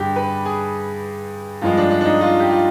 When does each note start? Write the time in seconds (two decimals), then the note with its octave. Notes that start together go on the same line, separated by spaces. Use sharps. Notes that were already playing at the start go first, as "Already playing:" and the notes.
Already playing: G2 D3 G4 G#4
0.16 B4
0.45 G#4
1.62 G2 F3 G#3 F4
1.77 D4
1.91 D4
2.01 D4
2.05 D#4
2.21 F4
2.40 G4
2.50 F4